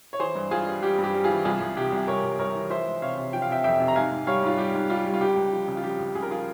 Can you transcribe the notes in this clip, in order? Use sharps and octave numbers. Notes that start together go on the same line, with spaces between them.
C#5
E3 G#4 C5
G2
G2 F4 G#4
G3
G3 G4
G2
G4
G3
F4 G#4
E3
C2 F4 G#4
C2
C3 G4
C2
C2 A#4 C#5
C2
C2 A#4 C#5
E3
F3 C5 E5
G#3
C3 C#5 F5
C3
F3 G5
F5
C3 E5 G5
F2 E5 G5
C3
A#5
G#2 F5 G#5
G#2
G3 C#5 F5
G#2 F4
G3 G4
G#2
G3 F4
G3
F4
C#2 G4
C#2
F3
C#3
F4
F3 G4
C#2
C#2 G#4
A#4
F3 F4 G#4